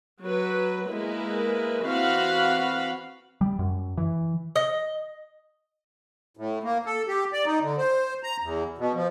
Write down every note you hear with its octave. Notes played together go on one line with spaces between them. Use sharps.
F#3 B4
G#3 A#3 E4 A#4 B4
E3 C4 F#4 F5 F#5 B5
G3
F#2
E3
D#5
A2
A#3
A4
G4
D5
D#4
D3
C5
A#5
E2
B2
F3